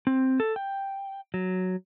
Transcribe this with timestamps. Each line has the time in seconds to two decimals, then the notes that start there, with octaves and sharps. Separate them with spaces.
0.07 C4
0.40 A4
0.56 G5
1.34 F#3